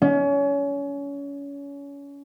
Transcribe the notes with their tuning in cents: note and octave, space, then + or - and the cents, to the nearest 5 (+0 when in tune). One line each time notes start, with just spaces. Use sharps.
C#4 +30